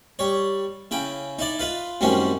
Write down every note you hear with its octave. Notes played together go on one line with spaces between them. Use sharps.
G3 C#5
C#3 E4 G5
D#4 E4 D5
F4 B4 F5
F#2 A2 D#3 G3 C4 C#4